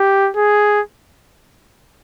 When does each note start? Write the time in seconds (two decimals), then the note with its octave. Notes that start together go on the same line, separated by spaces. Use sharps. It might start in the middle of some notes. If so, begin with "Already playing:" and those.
Already playing: G4
0.36 G#4